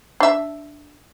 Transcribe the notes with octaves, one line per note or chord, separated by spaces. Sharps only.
D4 E5